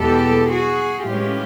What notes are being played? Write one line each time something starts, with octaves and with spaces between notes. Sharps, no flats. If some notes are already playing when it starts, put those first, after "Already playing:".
Already playing: E2 B2 G#3 B3 G4 A4
F#4 G#4
A2 E3 G#3 C#4 F4 G4